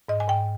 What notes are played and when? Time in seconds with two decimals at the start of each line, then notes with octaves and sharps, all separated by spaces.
0.09 G#2 D#5
0.20 G#5
0.28 G#2 G5